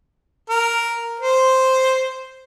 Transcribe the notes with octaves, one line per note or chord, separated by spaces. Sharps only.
A#4
C5